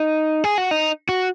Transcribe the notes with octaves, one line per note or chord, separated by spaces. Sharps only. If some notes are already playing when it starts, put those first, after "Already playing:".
Already playing: D#4
G#4
F#4
D#4
F#4